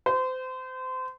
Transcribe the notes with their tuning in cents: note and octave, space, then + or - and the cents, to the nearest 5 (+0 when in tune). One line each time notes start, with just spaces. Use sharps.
C5 -30